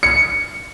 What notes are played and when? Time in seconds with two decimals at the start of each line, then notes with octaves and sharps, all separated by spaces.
0.03 C#7